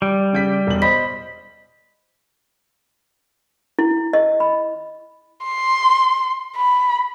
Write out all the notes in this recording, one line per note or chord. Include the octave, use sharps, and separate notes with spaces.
G3
C#3 G6 B6
E1 F#7
C5 D#5 B5 B6
E4
D#5
B5
C6
B5